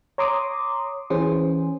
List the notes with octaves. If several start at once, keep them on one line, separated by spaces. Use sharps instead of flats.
C#5 A#5 C6 D6 D#6
E3 C#4 G#4 C5